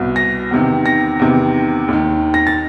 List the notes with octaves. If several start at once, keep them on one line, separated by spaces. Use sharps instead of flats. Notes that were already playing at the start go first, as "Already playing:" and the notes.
Already playing: C2 B2
A#6
E2 C3 D#3
A#6
E2 C3 D#3
D#2 D#3
A#6
A6